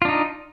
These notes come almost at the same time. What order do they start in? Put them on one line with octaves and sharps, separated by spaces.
F4 D4 D#4